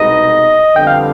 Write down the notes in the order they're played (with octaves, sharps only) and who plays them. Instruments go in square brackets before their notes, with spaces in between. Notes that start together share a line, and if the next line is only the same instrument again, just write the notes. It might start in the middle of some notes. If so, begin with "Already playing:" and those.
Already playing: [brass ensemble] C2 B2 G#3 B3 D#4 [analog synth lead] D#5
[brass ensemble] F2 D3 G3 B3 [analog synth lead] G5
[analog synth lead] F5